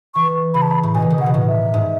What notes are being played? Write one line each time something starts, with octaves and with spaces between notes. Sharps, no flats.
E3 C#6
C#3 B5
A5
B5
A2
B2 G#5
E3
D#3
C#3 F#5
B2
A2
E5
G#2